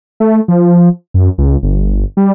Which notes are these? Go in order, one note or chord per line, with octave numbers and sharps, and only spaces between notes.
A3
F3
F#2
C#2
G1
G3